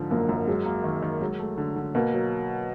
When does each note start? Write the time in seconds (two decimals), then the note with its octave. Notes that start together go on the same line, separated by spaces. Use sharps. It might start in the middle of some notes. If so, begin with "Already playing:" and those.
Already playing: G#2 D3 F3
0.11 F#2 A#3
0.29 F#2
0.47 F#3 G#3
0.66 A#3
0.84 D#3
1.02 D#3
1.21 F#3 G#3
1.39 A3
1.58 D3
1.76 D3
1.95 B2 A#3
2.14 F#3